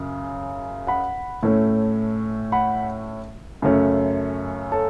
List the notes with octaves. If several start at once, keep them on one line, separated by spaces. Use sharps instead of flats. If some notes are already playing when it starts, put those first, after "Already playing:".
Already playing: F#2 C#3
F#5 B5
A2 A3 C#4
F#5 B5
F#2 C#3 A3 C#4
A4 C#5